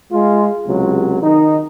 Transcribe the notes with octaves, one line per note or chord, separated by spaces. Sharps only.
G#3 F4
C#2 C3 F#3
D#3 D#4